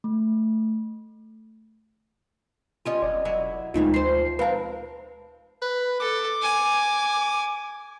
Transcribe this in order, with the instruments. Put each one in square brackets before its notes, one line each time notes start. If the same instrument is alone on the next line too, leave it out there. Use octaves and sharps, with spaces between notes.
[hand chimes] A3
[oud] G3 C#4 D#5 [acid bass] F4
[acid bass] E1 [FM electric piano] D5
[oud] F#3 E4 D#5
[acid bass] D2 [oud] A#2 D#3 E3 [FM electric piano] G#3 D#4 F4
[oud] F3 C5 [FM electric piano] C7
[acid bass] G#3 [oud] C4 A#4 [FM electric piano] B4 F5 A5
[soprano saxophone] B4
[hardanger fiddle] A4 [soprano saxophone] D6
[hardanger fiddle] G#5